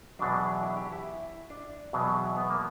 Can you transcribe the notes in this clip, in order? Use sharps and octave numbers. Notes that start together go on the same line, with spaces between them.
E2 B2 F#3 D4
E4
G4
E4
D4
E2 B2 F#3
B3
A#3